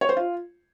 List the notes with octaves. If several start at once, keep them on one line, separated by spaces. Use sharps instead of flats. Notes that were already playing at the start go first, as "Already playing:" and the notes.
C#5
C5
F4